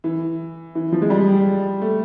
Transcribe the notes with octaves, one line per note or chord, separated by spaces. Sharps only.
E3
E3
F3
G#3
G3
A3